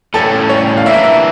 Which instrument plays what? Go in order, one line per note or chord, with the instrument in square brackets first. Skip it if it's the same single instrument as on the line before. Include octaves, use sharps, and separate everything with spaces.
[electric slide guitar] A2 G3 C#4 [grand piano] A4
[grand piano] C#5
F5
[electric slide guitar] E3 A#3 D4 [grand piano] E5
[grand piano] E5